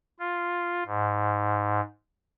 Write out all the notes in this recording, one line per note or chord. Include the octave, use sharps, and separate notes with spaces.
F4
G#2